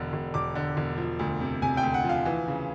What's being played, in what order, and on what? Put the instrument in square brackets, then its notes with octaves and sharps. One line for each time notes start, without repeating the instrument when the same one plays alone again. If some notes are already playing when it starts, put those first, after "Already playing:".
Already playing: [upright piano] E1 D3
E1
E1 D6
D3
E1
F3
D2
C3
C3 G#5
G5
D2
F#5
F3
F5
E3
C#3